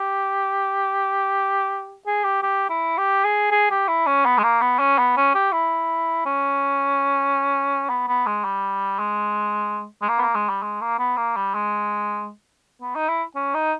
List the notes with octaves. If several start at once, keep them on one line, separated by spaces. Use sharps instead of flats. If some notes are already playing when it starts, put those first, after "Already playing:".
Already playing: G4
G#4
G4
G4
E4
G4
G#4
G#4
G4
E4
C#4
B3
G#3
A#3
B3
C#4
B3
C#4
G4
E4
C#4
B3
B3
G#3
G3
G#3
G#3
A#3
B3
A#3
G#3
G3
G#3
A#3
B3
A#3
G3
G#3
B3
D#4
E4
C#4
D#4